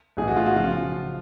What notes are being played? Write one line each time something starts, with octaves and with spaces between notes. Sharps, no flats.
B1 A2 E3 G#4
F#4
F4
F#4
C#3 F3 F4